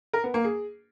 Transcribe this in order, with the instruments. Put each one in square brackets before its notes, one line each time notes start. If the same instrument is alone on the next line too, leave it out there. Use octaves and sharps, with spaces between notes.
[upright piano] A#4
B3
A#3
G#4